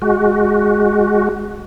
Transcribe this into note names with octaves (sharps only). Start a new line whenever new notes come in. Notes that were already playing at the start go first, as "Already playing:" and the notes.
G#3 F#4